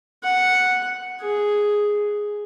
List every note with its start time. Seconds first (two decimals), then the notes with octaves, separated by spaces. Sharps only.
0.23 F#5
1.21 G#4